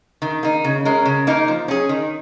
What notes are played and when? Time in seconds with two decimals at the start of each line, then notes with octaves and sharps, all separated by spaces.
0.22 D#3
0.43 A#3 D#4
0.64 C#3
0.85 G#3 C#4 A#4
1.06 C#3
1.27 A#3 D#4 A#4
1.48 F3
1.68 C#4 G#4
1.89 D#3